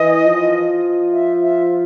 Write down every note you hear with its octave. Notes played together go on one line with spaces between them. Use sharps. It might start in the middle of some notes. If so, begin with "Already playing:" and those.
Already playing: E3 D#5
F3
E5
E5